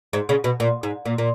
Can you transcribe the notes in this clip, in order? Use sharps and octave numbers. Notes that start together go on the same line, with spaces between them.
G#2
C#3
B2
A#2
G#2
A#2
A#2